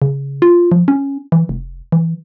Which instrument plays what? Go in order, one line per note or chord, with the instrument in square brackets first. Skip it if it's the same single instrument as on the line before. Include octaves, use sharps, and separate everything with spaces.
[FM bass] C#3
F4
F3
C#4
E3
F1
E3